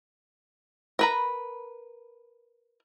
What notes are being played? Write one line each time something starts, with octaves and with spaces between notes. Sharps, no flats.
A#4 B4 A#5